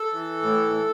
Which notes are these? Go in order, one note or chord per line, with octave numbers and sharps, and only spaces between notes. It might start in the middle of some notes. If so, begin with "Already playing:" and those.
Already playing: A4
E3
A2